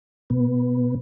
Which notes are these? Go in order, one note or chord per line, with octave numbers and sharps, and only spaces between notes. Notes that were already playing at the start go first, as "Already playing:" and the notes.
B2 B3